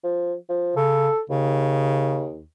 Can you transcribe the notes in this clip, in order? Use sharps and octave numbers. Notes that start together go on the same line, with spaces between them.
F3
F3
C#3 A4
D#2 C#3